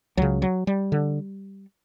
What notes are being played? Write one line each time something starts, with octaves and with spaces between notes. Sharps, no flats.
C#2 C#3 F#3
F#3
G3
D3